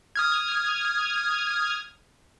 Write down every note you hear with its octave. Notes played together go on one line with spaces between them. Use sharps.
D#6 F6 G#6